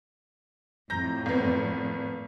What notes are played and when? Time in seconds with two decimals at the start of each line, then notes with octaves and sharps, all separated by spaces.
0.90 F2 A2 A#5 G6 A#6
1.26 G#1 B3